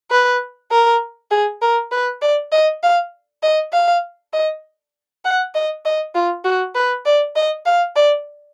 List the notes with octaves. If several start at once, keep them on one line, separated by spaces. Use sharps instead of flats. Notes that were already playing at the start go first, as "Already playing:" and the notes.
B4
A#4
G#4
A#4
B4
D5
D#5
F5
D#5
F5
D#5
F#5
D#5
D#5
F4
F#4
B4
D5
D#5
F5
D5